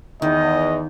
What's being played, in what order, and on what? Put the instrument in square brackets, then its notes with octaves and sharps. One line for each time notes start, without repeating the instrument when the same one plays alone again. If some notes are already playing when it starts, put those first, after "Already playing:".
[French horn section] E2 [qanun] D#3 [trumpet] D#5